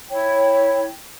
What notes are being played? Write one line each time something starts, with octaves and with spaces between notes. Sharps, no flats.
E4 C#5 G5